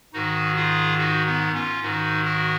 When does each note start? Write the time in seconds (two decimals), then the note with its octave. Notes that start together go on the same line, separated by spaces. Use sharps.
0.13 G#2 D#3 D#4 F#4
0.56 F4 G#4
0.98 D#4 F#4
1.26 B3 D#4
1.54 C#4 F4
1.82 G#2 D#3 D#4 F#4
2.25 F#4 A#4